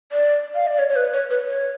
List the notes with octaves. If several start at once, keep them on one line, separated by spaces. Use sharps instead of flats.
D5
F5
D5
C#5
C#5
B4
C#5
B4
C#5